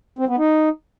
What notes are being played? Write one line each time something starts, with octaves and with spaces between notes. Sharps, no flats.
C4
B3
D#4